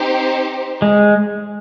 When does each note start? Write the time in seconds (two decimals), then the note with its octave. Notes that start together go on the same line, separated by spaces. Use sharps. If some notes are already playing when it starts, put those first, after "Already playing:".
Already playing: C4 D#4 G4 C5
0.82 G#3